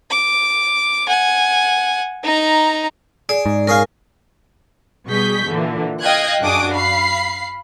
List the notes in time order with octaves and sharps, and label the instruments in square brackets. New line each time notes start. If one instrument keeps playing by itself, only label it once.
[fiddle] D6
F#5 G#5
D#4 A#5
[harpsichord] G#4 [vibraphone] D5
[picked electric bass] G#2
[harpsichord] C#4 G#4 F5 [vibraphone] A#4 G#5
[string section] B2 G3 G#4 C#6 G6 B6
A#2 D3 E3
D#5 F5 G5 F#6 G#6
F#2 D4 F#4 G#4 D6 D#6
F5 B5 C7